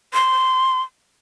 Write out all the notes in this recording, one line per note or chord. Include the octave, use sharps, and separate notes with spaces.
C6